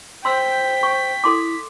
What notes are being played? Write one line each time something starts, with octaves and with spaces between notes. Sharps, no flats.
C5 G5 C6 E6 B6
C#6
E4 A4 C6 D6